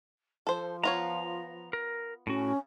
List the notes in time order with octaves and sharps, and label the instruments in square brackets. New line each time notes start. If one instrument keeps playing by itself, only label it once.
[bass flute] F3 [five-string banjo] A4 C5
[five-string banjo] B3 F4 C#5 [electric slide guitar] A#5
[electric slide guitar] A#4
[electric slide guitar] A2 F#4 [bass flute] C#4